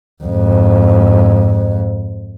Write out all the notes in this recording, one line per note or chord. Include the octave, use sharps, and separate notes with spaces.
F2 G#2